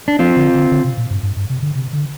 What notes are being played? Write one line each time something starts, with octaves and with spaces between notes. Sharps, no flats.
D4
F3 C4 F4
D3
D3
D3
C3
A#2
G2
G2
G2
C3
D3
C3
D3